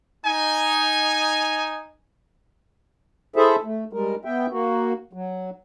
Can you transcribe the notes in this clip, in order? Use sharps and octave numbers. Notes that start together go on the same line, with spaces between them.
D#4 G#5
E4 G#4 A4 C5 E5
A3
G3 G#3 A#4
B3 E5 G5
A#3 F#4
F#3